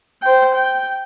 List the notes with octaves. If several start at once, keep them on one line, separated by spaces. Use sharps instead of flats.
C5 G5
G5